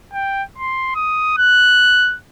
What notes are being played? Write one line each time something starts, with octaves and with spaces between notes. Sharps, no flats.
G5
C6
D#6
F#6